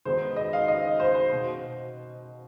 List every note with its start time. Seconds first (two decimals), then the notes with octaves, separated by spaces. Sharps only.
0.05 D#3 G#3 B3 D#4 C5
0.36 D#5
0.53 F5
0.68 D#5
1.00 C5
1.15 C5
1.31 B2